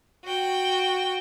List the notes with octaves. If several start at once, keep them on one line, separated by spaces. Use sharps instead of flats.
F#4 G5